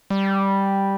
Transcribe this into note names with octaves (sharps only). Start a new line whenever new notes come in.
G3